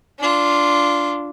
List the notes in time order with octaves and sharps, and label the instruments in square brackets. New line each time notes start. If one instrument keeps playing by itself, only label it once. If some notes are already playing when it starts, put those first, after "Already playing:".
[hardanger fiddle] D4 F4